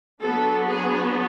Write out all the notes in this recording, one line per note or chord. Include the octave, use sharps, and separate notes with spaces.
F#3 B3 D4 A4
G#4